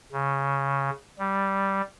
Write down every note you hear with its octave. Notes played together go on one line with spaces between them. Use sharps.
C#3
G3